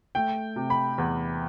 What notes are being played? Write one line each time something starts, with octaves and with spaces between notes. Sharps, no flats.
A3 G5
C3
B5
E2